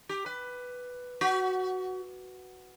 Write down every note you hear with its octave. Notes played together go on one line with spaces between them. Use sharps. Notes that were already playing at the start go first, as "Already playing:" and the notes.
G4
B4
F#4